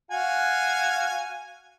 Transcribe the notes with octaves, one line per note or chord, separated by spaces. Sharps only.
F#4 F5 G#5